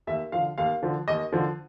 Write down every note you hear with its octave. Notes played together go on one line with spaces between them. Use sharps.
D#2 E5
D3 F3 F5
D#2 F5
D3 F3
D#2 D#5
D3 F3